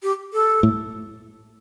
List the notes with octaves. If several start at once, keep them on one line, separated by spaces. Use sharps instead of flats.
G4
A4
A2